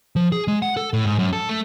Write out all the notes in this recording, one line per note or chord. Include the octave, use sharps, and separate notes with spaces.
F3
G#4
G#3
F#5
A4
A2
G#2
F#2
A4
A3